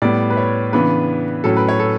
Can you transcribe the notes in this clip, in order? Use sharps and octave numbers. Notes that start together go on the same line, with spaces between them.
A2 G3 B3 D5
B4
C#5
C#3 E3 B3 D4 B4
A2 F#3 C#4 A4
B4
C#5
A4